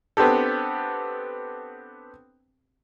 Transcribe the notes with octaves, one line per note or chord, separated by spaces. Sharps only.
B3 C4 D4 G4 A4